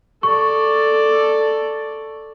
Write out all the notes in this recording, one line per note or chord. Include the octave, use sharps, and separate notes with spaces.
A4 D5 C#6